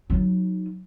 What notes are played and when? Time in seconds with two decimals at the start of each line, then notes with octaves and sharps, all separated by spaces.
0.10 F#3 D#4